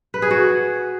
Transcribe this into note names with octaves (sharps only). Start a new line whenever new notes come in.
B4
G#4
F#4